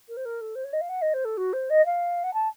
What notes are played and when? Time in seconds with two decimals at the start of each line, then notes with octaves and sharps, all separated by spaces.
0.09 A#4
0.17 C5
0.25 A#4
0.41 A4
0.55 C5
0.64 C#5
0.73 D#5
0.81 F5
0.89 F#5
1.02 D#5
1.14 C5
1.25 A4
1.37 F#4
1.53 C5
1.70 D#5
1.86 F5
2.24 F#5
2.34 A5